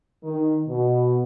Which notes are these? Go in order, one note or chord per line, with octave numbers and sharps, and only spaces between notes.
D#3
B2